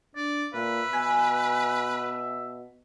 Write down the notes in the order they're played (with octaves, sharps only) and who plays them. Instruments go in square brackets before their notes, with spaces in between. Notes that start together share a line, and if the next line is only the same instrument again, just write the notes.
[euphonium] D4 [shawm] D5
[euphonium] A#2 [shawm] B4 [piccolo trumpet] E5
[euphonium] B2 [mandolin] G#5